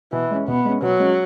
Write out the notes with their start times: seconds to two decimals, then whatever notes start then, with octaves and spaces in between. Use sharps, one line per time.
0.12 B2 E3
0.31 G#3 C#4
0.48 B2 B3
0.65 G#3 C#4
0.82 B2 F#3
1.00 G#3 C#4